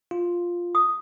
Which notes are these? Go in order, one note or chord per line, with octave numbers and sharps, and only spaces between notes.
F4
D#6